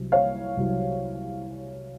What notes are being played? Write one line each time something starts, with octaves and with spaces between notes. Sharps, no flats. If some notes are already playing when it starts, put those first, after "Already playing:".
Already playing: C2 C3 F#3
C#5 F5
C2 C3 F#3